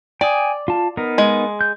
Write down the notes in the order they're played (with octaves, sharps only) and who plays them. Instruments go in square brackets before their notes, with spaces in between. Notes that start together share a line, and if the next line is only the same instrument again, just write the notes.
[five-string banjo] D5 [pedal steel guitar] G5 G#5 D#6
[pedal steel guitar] F4 A5
B3 D#4 A#4
[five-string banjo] G#3
[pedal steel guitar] G6